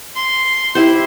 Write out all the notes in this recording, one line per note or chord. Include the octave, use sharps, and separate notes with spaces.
C6
E4 G4 C5